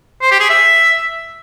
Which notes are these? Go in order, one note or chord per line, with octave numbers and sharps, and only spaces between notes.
C5
G4
G#4
E5